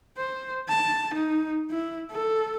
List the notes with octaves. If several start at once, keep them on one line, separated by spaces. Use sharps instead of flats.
C5
A5
D#4
E4
A4